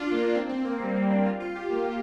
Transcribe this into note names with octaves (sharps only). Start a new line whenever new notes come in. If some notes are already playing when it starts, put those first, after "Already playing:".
Already playing: D4 F4
A#3
C4
C4
A#3
G3
A#3
D4
F4
F4
G4
A#3